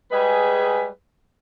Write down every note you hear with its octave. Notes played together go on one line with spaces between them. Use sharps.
G3 G#3 G#4 B4